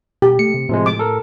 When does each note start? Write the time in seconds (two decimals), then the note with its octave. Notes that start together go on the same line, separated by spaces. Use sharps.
0.22 B2 G4
0.39 A3 C#7
0.54 C3
0.69 A2 C3 F3 G#3
0.86 A2 D6
0.99 A4 A#4